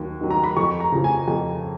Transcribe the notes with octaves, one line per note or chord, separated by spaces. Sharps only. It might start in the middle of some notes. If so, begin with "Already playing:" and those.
Already playing: D#2 F#3
D#3 F#3
A#5
B5
F2 C#6
A#5
C#3 F3
G#5
F2